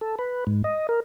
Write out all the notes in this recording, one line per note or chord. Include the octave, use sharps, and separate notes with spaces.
A4
B4
G#2
D#5
A#4